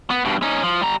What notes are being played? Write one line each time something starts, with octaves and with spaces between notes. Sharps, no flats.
B3
G2 B2
C#4 D#4
F3
G3 A#5